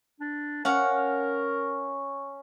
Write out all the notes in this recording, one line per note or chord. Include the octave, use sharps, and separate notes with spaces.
D4
C#4 A#4 C#5 F5 F#5